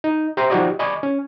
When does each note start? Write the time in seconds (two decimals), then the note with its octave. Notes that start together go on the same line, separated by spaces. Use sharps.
0.04 D#4
0.37 G4 C5 E5 A#5 C6
0.50 F3 D#4 F#4 G4 D5 D#5
0.79 D5 D#5 G#5 B5 C#6 D6
1.03 C#4